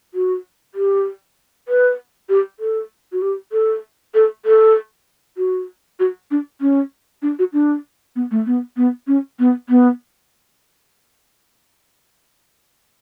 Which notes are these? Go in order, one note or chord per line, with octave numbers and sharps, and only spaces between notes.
F#4
G4
B4
G4
A4
F#4
G4
A4
A4
A4
F#4
F#4
D4
C#4
D4
F#4
D4
B3
A3
B3
B3
C#4
B3
B3